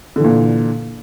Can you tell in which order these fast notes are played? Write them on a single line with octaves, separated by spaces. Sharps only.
D3 E3 A#2